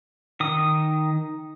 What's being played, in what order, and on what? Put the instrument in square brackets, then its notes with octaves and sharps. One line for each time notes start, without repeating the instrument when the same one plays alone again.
[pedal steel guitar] D#3 D#6